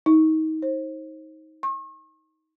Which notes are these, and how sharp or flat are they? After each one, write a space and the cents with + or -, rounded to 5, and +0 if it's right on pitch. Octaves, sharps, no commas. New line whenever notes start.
D#4 +25
C5 +30
C#6 -40